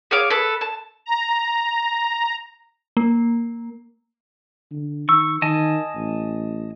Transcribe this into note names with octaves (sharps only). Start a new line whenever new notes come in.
G#4 C#5 F5 D6
A4 B4
A5
A#5
A#3
D3
D#3 C#6 E6
D#3 D#5 G#5 A5
A1